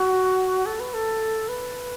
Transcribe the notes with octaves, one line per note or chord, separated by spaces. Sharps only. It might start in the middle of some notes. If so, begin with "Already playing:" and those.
Already playing: F#4
A4
B4
A4
B4